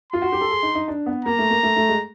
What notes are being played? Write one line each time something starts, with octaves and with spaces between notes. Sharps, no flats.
F4 C6
F#4
G4
A4
G#4
D#4
D#4
D4
B3
A#3 A#5
A3
A#3
A3
A3
G#3